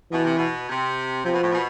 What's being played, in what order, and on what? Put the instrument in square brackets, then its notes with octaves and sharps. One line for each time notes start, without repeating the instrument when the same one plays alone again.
[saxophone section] B2 [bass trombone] E3
[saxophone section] C3
B2
C3
[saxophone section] C3 [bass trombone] F3
[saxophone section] B2
A2
B2